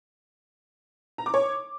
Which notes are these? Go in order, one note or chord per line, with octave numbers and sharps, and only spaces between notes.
A#5
D6
C#5